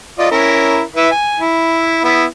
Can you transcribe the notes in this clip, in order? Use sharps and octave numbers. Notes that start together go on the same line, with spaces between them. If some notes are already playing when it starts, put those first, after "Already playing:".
F4 D5 D#5
C#4 E4 A#4
E4 B4 E5
G#5
E4
B3 E4